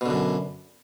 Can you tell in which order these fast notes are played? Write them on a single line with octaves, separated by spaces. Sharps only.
B2 D3 F#2